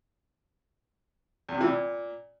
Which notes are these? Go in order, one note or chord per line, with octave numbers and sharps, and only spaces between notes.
E2
C3
E3
A#2